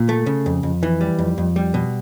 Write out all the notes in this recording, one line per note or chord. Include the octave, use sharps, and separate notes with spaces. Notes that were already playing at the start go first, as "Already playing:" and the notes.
Already playing: A#2
A3
C#3
F2
F2
E3
G3
F2
F2
G3
B2